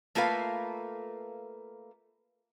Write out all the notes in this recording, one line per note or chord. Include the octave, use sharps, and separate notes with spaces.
A3 A#3 F4 A4 B4 F5